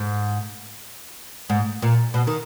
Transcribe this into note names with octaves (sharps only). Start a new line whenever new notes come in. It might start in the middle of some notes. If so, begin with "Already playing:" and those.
Already playing: G#2
G#2
A#2
B2
D#3